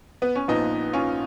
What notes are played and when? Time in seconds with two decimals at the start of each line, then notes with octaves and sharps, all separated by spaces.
0.22 B3
0.35 C#4
0.48 A#1 A#2 F3 B3 D#4
0.93 C#4 F4